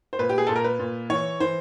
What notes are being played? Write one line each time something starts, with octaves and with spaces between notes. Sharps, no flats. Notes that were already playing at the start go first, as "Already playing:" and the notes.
C5
A#2 B4
G4
G#4
A#2 A4
A#4
B4
A#2
E3 C#5
E3 C5